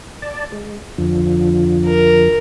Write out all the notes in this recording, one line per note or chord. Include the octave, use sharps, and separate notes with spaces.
D5 A5
G#3
F2 D3 F3
A#4